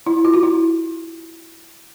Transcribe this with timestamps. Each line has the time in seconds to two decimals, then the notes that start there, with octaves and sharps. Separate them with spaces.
0.07 E4
0.25 F4
0.34 F#4
0.43 E4